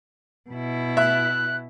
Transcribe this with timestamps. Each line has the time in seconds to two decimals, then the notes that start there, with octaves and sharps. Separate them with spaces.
0.50 B2 E4
0.97 E5 F#6